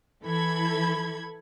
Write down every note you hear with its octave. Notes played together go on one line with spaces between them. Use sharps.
E3 A4 B5 G#6